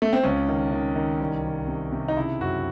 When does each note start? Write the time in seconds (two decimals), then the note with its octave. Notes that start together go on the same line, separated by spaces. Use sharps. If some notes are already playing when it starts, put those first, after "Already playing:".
0.02 A3
0.13 C4
0.23 C#2 C#4
0.49 D#3
0.72 D#3
0.96 D#3
1.20 C2
1.45 C2
1.68 C3
1.92 C3
2.08 D#4
2.17 C#3 E4
2.40 F#2 F#4